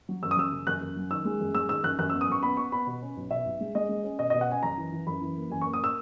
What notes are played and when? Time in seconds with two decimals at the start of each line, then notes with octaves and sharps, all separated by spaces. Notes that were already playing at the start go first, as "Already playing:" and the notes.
0.09 F#3
0.23 F#2 E6
0.31 D#6
0.37 F#2 E6
0.52 C#3
0.67 F#2 F#6
0.81 F#2
0.96 F#3
1.11 D#3 E6
1.25 G#3
1.40 F#2
1.54 G#3 E6
1.69 D#3 E6
1.84 F#2 F#6
1.99 F#2 F#6
2.10 B3 E6
2.21 D#6
2.28 F#2 C#6
2.43 B3 B5
2.57 B3 C#6
2.72 B3 B5
2.87 B2
3.02 C#4
3.16 B1
3.31 B2 E5
3.45 B1
3.60 G#3
3.75 G#3 D#5
3.89 G#3
4.04 C#4
4.19 B2 D#5
4.30 B2 D#5
4.41 F#5
4.48 C#4 G#5
4.63 F#2 A#5
4.78 E3
4.92 E3
5.07 F#2 B5
5.21 E3
5.36 A#3
5.50 F#2 G#5
5.61 A#3 C#6
5.73 D#6
5.84 E6